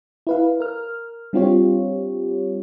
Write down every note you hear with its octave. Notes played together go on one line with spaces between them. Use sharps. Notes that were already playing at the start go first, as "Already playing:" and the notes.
E4 B4 F5
A#4 F6
G3 C4 D4 F4 G4 C#5